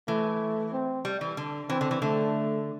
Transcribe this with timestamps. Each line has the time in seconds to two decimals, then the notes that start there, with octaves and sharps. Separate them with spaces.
0.08 E3 A3
0.72 C4
1.05 G3
1.21 E3
1.37 D3
1.70 E3 C4
1.81 D3
1.91 E3
2.02 D3 A3